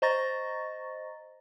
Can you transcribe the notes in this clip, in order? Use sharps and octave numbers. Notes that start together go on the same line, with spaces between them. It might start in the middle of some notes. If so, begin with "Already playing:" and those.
C5 D#5 A#5 C#6 A6 A#6